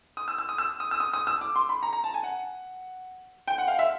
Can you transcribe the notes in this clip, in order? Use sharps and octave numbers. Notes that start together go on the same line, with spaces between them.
D#6
E6
E6
D#6
E6
D#6
E6
D#6
D#6
E6
D6
C6
B5
A#5
A#5
A5
G#5
F#5
G5
F#5
F5
E5